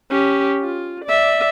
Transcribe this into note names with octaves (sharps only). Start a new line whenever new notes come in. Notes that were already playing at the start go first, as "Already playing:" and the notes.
C#4 G4
F4
D5 E5